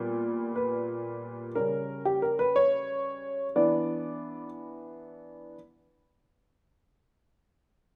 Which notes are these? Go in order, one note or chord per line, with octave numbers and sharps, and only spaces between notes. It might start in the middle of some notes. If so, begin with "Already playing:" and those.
Already playing: A#2 G3 B3
B4
C#3 G3 C#4 A#4
G4
A#4
B4
C#5
E3 B3 D4 D5